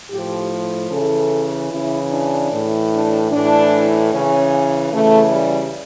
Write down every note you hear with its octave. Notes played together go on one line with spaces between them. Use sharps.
A2 F3 G4
C#3 E3 A4
C#3 E3 E4
D4
A2 E3
D4
A2 E3 D4
C#3 E3 C#4
C#3 E3 A3
G3